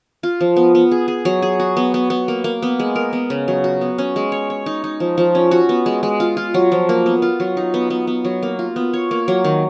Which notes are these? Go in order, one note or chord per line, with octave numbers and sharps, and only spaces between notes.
F4
F3
B3
B3
G#4
G#4
F#3
G#4
F#4
B3
B3
B3
A#3
A#3
B3
G#3
A#4
B3
C#3
F#3
F#4
B3
C#4
G#3
C#5
C#5
D#4
D#4
F3
F3
C#4
F#4
B3
G#3
G#3
F4
F4
F#3
F3
A#3
B3
F4
F#3
D#4
B3
B3
B3
F#3
A#3
F4
B3
C#5
A#3
F#3
D#3